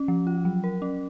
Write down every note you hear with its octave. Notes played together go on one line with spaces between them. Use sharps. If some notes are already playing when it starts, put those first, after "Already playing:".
Already playing: C#4
F3
F4
F#3
A#4
C#4